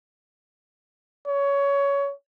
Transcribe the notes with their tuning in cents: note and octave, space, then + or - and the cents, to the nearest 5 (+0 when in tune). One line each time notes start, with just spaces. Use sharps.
C#5 +20